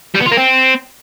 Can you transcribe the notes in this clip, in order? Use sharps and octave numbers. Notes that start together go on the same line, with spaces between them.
G3
B3
F4
A#3
C4